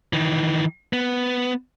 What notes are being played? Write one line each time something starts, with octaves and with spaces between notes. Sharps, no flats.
D#3 E3
B3